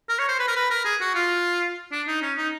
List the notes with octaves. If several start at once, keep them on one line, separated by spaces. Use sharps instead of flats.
A#4
C#5
C5
B4
A#4
B4
A#4
G#4
F#4
F4
D4
D#4
C#4
D#4